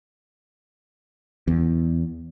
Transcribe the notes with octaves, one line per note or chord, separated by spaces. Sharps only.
E2